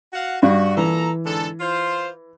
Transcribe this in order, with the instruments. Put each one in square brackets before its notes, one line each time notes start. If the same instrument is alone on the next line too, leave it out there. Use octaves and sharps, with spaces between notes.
[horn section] F#4 F5 F#5
[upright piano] G2 [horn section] F#4
[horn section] A#2 A4 A#5 [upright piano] E3
[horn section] G#2 D3 A4
F4 C5